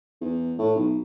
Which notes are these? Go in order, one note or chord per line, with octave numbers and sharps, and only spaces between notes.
E2
A2
B1